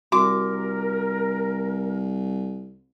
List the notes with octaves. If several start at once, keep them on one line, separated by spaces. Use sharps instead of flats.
C2 F#4 A#4 D6